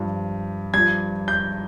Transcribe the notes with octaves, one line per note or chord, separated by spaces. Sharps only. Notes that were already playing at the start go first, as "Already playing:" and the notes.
Already playing: G2 F3
G2 F3 G#6
G6